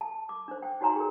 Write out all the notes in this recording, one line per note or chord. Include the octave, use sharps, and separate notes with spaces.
A5
D6
D4 C5
G5
D#4 F#4 C#5 G#5 A#5 C6
G#4 A#4